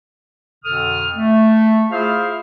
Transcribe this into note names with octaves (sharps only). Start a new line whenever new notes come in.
F2 B2 D3 A4 D#6 F6
A3
E4 F4 G#4 C5 E5 F5